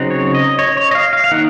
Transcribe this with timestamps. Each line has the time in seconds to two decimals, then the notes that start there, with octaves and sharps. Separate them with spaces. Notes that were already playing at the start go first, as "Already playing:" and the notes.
Already playing: C#3 F#3 C4 D#4
0.10 C#5
0.35 D#5
0.59 C#5
0.77 C#5
0.91 D#5
0.95 F5
1.13 F5
1.24 F5
1.31 D#3 A#3 D#4 F#5